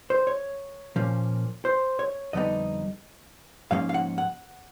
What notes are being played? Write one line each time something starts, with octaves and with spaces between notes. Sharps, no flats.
C5
C#5
A#2 F3 A#3 C#4
C5
C#5
F2 D3 G3 B3 D#4 D#5
G#2 F3 A#3 C#4 F5
F5
F#5
F#5